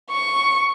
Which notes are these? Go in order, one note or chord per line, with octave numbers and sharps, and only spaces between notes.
C#6